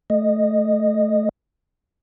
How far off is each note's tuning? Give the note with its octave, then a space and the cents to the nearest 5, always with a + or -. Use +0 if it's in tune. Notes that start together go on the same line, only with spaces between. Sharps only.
A3 -10 D#5 -15